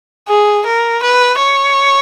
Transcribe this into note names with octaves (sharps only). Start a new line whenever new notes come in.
G#4
A#4
B4
C#5